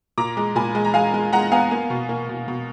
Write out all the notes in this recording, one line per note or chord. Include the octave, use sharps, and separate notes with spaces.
A#2 A#5 D6
G#3
A#2 G#5 B5
G#3
A#5
G#3 F5 G#5
G#3
G#3 F#5 A#5
B3 F5 G#5
A#3
B2
A#3
B2
B2